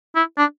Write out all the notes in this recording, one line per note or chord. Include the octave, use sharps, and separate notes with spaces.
E4
D4